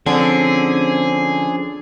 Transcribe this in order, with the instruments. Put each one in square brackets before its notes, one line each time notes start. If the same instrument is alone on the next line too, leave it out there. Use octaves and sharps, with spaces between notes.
[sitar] D3 [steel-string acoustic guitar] F3 C4 C#4 [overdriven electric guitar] G#4